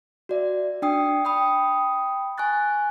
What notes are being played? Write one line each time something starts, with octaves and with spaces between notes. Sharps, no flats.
F#4 D5 E5
D4 G5 D#6 C7
G5 B5 D#6
G#5 C#6 F#6 A6